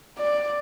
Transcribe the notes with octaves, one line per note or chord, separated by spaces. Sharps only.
D5